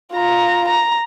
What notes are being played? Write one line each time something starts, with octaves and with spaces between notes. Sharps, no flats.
F4 A#5
A#5